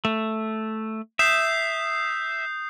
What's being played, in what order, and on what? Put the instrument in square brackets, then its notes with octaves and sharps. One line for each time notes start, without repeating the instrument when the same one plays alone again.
[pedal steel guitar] A3
[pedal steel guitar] E5 [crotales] D#6 G6 C7